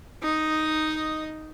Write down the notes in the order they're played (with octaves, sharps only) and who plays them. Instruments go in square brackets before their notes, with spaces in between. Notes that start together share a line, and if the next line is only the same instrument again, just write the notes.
[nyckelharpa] D#4 D#5